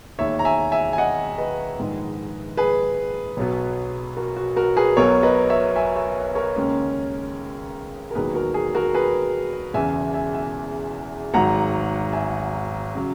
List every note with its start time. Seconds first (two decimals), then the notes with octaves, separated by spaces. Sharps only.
0.18 E1 D#2 D#3 C#5 E5
0.39 A#5
0.45 E5 G#5
0.72 E5 G#5
0.93 G#5
0.98 D#5 F#5
1.38 B4 D#5
1.78 A#1 G#2 D#3 G#3
2.57 G#4 B4
3.37 B1 B2 F#3 B3
4.17 F#4 A#4
4.37 F#4
4.56 F#4 A#4
4.76 G#4 B4
4.97 B1 B2 F#3 B3 A#4 C#5
5.23 B4 D#5
5.50 C#5 E5
5.76 E5 G#5
5.96 C#5 E5
6.35 A#4 C#5
6.56 D#2 C#3 G#3 C#4
8.11 A#4
8.15 E1 D#2 D#3 F#3 B3 G#4 B4
8.35 F#4 A#4
8.54 G#4
8.75 F#4 A#4
8.94 G#4 B4
9.74 E1 E2 C#3 E3 E5 G#5
10.14 E5 G#5
10.34 E5 G#5
11.33 G#1 G#2 D#3 F#3 F#5 A#5
12.13 E5 G#5
12.95 C#3 F#3